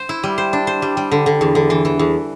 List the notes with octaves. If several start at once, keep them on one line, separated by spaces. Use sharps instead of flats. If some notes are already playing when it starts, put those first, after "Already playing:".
Already playing: C5
E4
G3
C5
D4
C5
G3
G3
D3
D3
E2
D3
E3
E3
E2